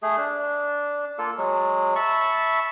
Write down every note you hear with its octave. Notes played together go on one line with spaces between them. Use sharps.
A3 G#4
D4
A#3 F4 A4
F#3 G#3
E5 A5 B5 C#6